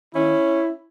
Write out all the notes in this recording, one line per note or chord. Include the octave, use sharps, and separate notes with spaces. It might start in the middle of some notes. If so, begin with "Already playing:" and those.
D#3 A#3 C#4 E4